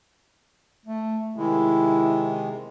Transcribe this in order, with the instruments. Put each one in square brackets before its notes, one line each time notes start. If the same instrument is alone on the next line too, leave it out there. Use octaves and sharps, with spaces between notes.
[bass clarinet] A3
[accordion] C3 D#3 G#3 [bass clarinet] E4